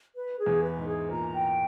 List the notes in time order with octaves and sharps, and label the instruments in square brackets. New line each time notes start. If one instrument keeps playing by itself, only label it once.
[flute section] B4
G#4
[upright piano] E2 E3
[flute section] B4
[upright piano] G#2 G#3
[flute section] G#4
[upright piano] A#2 A#3 [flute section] A#5
[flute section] G5